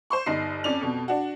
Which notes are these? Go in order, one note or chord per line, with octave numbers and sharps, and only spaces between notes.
C5 C6 C#6
G1 D#4 C7
F2 C#4 D5 F7
F2 B2
D4 F#4